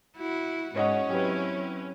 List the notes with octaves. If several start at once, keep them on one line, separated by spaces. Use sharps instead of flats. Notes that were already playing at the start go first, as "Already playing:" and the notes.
E4 F#4
G#2 C#4 C#5 D#5 F#5
F#3 C4 E4 G4 B4